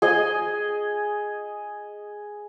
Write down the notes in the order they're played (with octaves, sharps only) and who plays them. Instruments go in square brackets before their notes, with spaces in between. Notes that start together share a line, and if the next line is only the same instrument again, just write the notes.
[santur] G#4 D#5 G#5